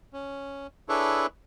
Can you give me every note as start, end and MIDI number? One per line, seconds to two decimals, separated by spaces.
0.13 0.67 61
0.89 1.26 62
0.89 1.26 64
0.89 1.26 68
0.89 1.26 69
0.89 1.26 71
0.89 1.26 73